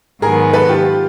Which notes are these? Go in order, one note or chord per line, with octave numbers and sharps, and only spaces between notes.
G#2 D#3 F#3 B3 G#4 A#4
A4 B4
F4 G4